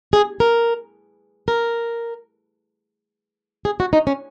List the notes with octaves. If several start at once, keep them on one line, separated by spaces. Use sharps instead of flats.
G#4
A#4
A#4
G#4
F#4
D#4
C#4